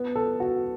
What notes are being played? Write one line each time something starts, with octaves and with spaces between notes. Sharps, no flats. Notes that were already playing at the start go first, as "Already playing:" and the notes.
Already playing: B3
A4
F#4